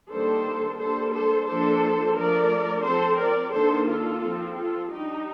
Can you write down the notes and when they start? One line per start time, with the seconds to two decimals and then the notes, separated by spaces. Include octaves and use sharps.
0.10 D#3 G3 A#3 D4 A4 C5
0.78 G3 A#3 D4 A4 C5
1.13 A4 C5
1.47 F3 A#3 D4 A4 C5
2.16 F3 A3 D4 A#4 D5
2.84 F3 C4 A4 C5
3.19 A#4 D5
3.53 D#3 A#3 D4 A4 C5
3.88 F4 A4
4.22 F3 C4
4.57 F4 A4
4.90 G3 D4 D#4 G4